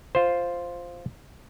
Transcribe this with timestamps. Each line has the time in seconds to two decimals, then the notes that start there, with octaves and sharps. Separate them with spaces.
0.15 F4 C5